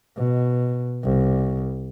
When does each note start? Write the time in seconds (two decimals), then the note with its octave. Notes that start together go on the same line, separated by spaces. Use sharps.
0.17 B2
1.04 C2